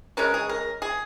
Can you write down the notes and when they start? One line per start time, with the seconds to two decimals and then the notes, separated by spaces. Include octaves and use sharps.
0.17 C#3 G#3 C#4 A#4
0.34 G#4
0.49 A#4
0.82 G#4